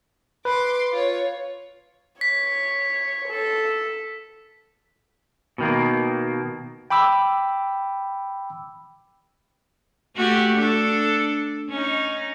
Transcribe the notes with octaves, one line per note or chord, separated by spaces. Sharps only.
B4 C6 D6
F4 C#5
C#5 B6
A4
B2 D#3 A#3
G5 B5 D6 E6
A3 F#4 G4
D4 A4
C#4 D#4